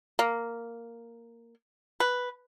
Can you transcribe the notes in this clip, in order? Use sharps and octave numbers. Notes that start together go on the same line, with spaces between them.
A#3
B4